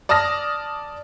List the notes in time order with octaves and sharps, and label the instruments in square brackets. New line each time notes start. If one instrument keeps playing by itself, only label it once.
[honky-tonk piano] D5 A5 D#6 F6 A#6